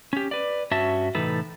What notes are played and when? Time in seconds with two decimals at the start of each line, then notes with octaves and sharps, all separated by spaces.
0.13 C#4 G4
0.31 B4 D5
0.71 G2 C#4 F#4 E5 A5
1.15 A2 C3 E3 D#4 A4 B4